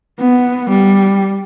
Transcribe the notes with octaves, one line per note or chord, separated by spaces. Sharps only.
B3
G3